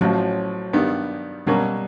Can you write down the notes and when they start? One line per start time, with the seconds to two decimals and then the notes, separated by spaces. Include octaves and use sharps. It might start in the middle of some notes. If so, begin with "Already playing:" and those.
0.01 A1 A2 F3 F#3
0.73 G2 D#3 G3 B3
1.47 B2 F#3 G3 A#3 C#4